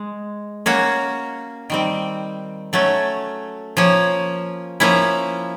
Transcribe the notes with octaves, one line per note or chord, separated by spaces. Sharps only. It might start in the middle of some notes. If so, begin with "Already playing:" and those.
Already playing: G#3
A#3 C#4 F#4
D#3 G3 C4
F#3 A3 C#4
F3 A#3 C#4
F3 A#3 C#4 E4